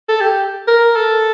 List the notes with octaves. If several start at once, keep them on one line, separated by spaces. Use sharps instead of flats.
A4
G4
A#4
A4